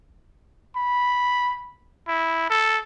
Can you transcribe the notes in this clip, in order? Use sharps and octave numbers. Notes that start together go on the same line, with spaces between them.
B5
E4
A4